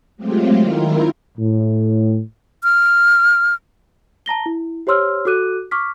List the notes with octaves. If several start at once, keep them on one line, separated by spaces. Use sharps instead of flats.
F#3 G#3 A3 C4 F4 G4
D#3 E4 F4 A#4
A2
F6
A5 A#5 A#6 G7
E4
G4 C5 C#5 C6 E6 F6
F#4 A4 D6 F#6 D#7
C#6 D6 F6 B6